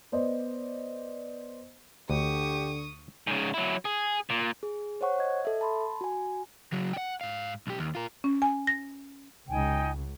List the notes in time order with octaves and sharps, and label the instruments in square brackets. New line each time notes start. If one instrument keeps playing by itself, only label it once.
[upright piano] B3 C5 D5 D#5
[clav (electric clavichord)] D2 [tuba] D3 [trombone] G4 [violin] C#6 D#6
[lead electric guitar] G#2 C#3
F#3 E4
G#4
A#2
[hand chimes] G#4
C5 C#5 F#5 C#6
D#5 G#6
A4 E5
A5 B5 C6
F#4 G#5
[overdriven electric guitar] C#3 F#3
F#5 G5
G#2 F5
B1 G4
D#2
F4 A#4
[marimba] C#4
G#5
A#6
[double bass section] C#2 [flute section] D#4 G5 G#5